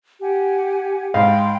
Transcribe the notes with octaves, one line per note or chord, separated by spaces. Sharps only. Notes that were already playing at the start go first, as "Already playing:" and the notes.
G4 F#5 G#5
G#2 F5 G5 B5 C6